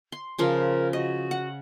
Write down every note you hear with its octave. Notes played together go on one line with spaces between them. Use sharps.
C6
C#3 F3 F4 A#4
F#4 D#5
F#5